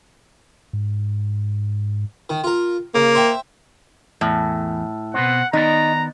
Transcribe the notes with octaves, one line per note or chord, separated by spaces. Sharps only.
G#2
D#3
F4 A#4
C#3 A#3
C5 E5 G5
E2 A2
B2 B3 C4 F#5
D#3 B3 D#4 D5 A#5